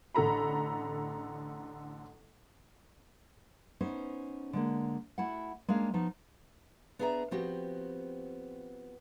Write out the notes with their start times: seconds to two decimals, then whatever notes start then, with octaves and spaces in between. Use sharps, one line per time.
0.14 A1 D3 A4 A#5 B5
3.81 B3 C#4 D#4 C5
4.53 D3 G#3 A#3
5.18 A3 E4 F#4 F#5
5.68 G#3 A#3 C#4 D4 F5
5.94 F3 B3 D#4 F#4
6.99 B3 D4 G#4 E5 F5 A#5
7.31 F3 B3 C4 F#4 G4